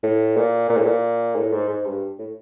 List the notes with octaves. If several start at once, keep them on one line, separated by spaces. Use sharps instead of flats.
A2
A#2
A#2
A2
A#2
A2
G#2
G#2
G2
A2